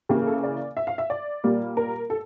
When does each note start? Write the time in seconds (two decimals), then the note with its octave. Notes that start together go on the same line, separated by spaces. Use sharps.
0.09 C#3 E3 A#3 G4
0.27 A4
0.43 D5
0.77 E5
0.87 F5
0.98 E5
1.10 D5
1.44 A#2 G3 A#3
1.77 A#4
2.10 A4